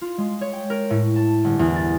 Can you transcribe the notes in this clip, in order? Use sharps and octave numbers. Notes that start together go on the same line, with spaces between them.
F4
G#3
C#5
G5
A#4
A2
A5
G1
E2
A6